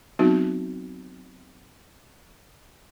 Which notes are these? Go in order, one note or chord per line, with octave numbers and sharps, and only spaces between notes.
F#3 B3 C4 D#4 F#4